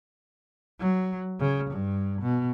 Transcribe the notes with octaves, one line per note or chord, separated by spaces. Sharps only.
F#3
C#3
G2
B2